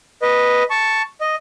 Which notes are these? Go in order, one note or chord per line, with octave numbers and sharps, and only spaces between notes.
B4 D#5
A5 C#6
D#5